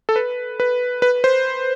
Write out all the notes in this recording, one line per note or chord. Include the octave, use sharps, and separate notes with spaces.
A4
B4
B4
B4
C5